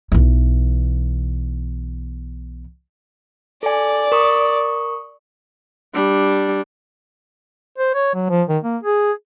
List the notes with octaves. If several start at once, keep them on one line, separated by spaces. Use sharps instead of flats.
B1 E3
A4 D5 G#5
A#4 C#6 D#6
G3 D4
C5
C#5
F#3
F3
D#3
A#3
G#4